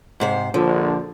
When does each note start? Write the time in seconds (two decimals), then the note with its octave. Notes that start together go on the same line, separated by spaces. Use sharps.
0.20 G#2 C3 C5
0.54 A#1 D3 F3